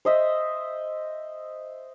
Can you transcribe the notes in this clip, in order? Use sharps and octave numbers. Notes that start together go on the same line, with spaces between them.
C5 D#5 E5